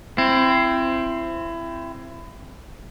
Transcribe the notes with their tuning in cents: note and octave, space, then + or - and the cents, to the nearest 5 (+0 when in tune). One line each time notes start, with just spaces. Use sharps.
C4 +0 E4 +25